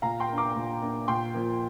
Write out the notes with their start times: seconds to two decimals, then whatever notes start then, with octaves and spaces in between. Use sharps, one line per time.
0.02 A#2 F5 A#5
0.20 G5 C6
0.29 A#3 D4
0.38 A#5 D6
0.55 A#2
0.82 A#3 D4
1.08 A#2 G5 C6
1.34 F3 A#3